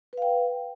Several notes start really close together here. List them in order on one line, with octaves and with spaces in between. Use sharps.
B4 F5 G5